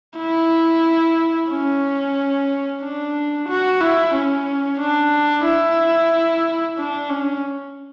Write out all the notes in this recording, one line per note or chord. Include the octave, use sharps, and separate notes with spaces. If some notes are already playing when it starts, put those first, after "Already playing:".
E4
C#4
D4
F#4
E4
C#4
D4
E4
D4
C#4